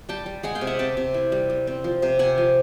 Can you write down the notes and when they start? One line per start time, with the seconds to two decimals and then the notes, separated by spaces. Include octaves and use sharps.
0.09 G3 G5 A5
0.26 G3
0.43 G#3 F#5 G#5
0.55 F5 G5
0.61 C3
0.67 E5 F#5
0.79 C3 G5 A5
0.97 C3
1.14 E4
1.32 G3
1.50 G3
1.67 C4
1.84 F3
2.02 C3
2.19 C3 F#5 G#5
2.38 F3